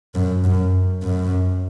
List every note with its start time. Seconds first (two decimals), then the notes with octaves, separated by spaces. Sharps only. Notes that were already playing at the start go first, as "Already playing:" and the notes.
0.15 F#2
0.45 F#2
1.03 F#2